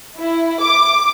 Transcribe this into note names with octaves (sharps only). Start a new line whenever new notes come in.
E4
D6